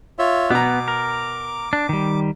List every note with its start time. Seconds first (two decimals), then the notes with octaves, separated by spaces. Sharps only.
0.19 F4 C#5 E5
0.50 B2 B3 A#5 D6
0.88 A#4
1.73 D4
1.89 D#3 G3